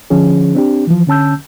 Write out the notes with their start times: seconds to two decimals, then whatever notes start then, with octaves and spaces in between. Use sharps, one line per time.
0.10 D3 F3 C#4 G#4
0.55 C4 D4 G4
0.87 E3 F3
1.07 D3 C#4 A5 E6 G6